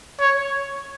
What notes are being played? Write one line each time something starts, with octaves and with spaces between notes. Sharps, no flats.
C#5